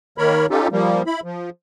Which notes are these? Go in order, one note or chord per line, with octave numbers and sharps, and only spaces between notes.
D#3 A#3 A#4 C#5 B5
C#4 D#4 F4 G4 A4
F3 G3 A#3
E4 B5
F3